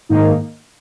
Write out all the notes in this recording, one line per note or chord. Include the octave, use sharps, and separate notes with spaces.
G#2 D#3 A#3 D#4